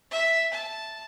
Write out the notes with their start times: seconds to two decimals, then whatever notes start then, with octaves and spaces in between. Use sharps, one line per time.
0.11 E5
0.53 A5